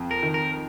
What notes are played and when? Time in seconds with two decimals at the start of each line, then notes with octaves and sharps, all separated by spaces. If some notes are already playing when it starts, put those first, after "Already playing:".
Already playing: F2
0.11 A#4
0.23 D#3
0.34 A#4